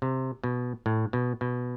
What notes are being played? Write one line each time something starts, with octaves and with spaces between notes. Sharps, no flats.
C3
B2
A2
B2
B2